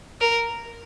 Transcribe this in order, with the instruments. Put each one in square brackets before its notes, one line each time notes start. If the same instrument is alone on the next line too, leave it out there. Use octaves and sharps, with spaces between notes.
[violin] A#4